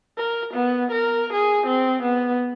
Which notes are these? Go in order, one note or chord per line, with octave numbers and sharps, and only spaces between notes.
A#4
B3
A#4
G#4
C4
B3